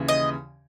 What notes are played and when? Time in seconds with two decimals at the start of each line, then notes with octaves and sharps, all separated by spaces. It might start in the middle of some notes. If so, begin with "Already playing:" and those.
Already playing: D#2 C#3 E3
0.08 D#5